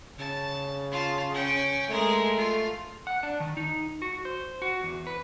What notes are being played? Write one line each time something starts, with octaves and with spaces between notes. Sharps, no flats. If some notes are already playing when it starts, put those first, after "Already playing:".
C#3 A5
F4 A5
C#4 G5
G#3 A3 A#4
F4
F#5
D4
D#3
D#4
F#4
C5
F#4
E2
B4